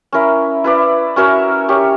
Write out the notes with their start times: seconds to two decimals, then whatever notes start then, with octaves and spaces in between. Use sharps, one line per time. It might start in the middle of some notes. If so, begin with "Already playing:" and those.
0.13 C#4 E4 A#4
0.64 E4 B4 D5
1.16 C#4 F#4 A#4 E5
1.68 C#4 G4 C#5